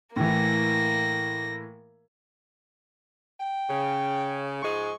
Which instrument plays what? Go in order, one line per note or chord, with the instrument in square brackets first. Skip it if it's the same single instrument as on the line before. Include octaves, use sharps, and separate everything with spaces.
[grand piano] A2 E3 [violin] A#3 A#6
[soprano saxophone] G5
[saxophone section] C#3
[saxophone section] G#2 F3 G#3 [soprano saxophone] C#6